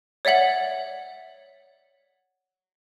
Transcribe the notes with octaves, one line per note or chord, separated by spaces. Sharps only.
C#5 D5 E5 F#5 F#7